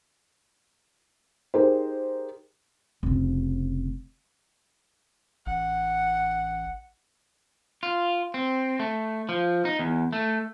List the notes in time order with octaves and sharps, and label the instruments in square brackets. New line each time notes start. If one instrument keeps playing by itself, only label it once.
[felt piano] D#4 G4 G#4 A#4 C5
[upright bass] F1 C#3
[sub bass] A1 [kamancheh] F#5
[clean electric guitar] F4
C4
A3
F3
D#4
E2
A3